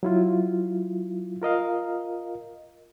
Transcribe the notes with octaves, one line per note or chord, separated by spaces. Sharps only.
F#3 E4 F4
F4 A#4 D#5 F5